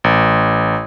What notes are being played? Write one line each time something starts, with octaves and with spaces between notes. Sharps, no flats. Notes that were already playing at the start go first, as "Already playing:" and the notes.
A1